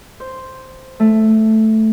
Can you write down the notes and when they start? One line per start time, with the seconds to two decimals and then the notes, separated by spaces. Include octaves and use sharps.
0.20 C5
1.00 A3